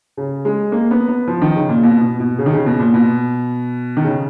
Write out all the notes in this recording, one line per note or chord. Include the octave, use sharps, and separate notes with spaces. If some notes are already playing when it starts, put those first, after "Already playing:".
C#3
G#3
A#3
B3
B3
F3
D#3
C#3
A#2
B2
B2
B2
C#3
D#3
C#3
B2
A#2
B2
D#3
C#3